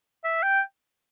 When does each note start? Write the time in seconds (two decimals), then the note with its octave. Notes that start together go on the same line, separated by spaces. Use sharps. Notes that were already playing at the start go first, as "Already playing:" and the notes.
0.24 E5
0.43 G5